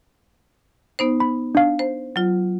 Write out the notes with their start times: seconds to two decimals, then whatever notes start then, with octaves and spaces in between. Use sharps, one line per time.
0.99 B3 D#4 C5
1.20 B5
1.55 D4 F5
1.79 C5
2.16 F#3 F4